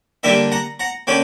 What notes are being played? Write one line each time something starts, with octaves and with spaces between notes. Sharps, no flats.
D3 G3 A#3 D4 E5 G5
F#5 A#5
F#5 A#5
D3 A#3 C#4 G5 B5